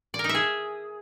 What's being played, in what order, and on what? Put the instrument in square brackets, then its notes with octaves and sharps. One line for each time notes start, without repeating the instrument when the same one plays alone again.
[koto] D5
A#4
D#4
E5
G#4